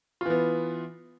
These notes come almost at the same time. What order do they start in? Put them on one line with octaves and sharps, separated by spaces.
F4 E3 B3